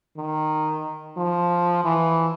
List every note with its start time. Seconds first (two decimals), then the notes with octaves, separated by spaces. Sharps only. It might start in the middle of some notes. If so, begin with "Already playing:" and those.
0.17 D#3
1.17 F3
1.84 E3